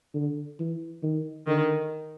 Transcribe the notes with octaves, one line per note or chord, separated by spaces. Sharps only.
D3
E3
D#3
D3 D#3